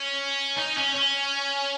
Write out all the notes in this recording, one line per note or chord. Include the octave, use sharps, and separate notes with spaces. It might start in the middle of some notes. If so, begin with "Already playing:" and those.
Already playing: C#4
D#4
C#4
C#4